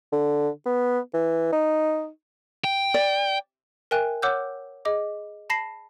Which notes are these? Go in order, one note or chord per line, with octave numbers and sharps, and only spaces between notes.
D3
B3
E3
D#4
G5
D5
A#4 E5 G5 G#5 F#6
C#5 F#5 D6 E6 F#6 G6
G#4 D#5 D6
A5 B5 A#6 C7 E7